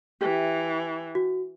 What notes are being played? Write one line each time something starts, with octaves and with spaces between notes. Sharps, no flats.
E3 G4 E5
F#4